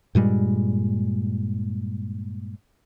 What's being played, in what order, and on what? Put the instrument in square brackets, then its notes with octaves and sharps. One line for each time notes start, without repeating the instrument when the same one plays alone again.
[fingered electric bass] G2 A#2 G3 G#3